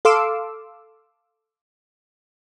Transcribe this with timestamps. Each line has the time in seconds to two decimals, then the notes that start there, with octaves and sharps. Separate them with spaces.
0.05 A4 F5 C6 D6 E6